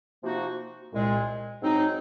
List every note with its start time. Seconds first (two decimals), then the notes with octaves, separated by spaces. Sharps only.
0.22 C3 F3 A#3 D#4 F#4
0.92 C2 A#2 G#3
1.61 G#2 F#3 C4 D#4 G#4